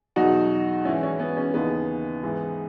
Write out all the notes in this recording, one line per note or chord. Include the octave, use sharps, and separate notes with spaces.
E2 B2 F#3 D#4 F#4
G#2 E3 C#4 E4
C#4
B3
C#4
D#2 C#3 E3 B3 D#4
G#2 E3